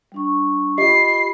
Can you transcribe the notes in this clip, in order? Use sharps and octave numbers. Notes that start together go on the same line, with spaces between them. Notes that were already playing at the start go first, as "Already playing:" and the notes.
G3 D4 C#6
F4 G4 D#5 B5 C7